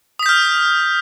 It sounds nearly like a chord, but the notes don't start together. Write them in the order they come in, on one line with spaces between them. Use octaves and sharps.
D#6 B6 G6 F6